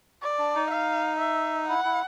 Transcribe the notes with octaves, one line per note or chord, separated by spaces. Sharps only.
D5
D4
D#4
F5
E5
E4 F#5
E4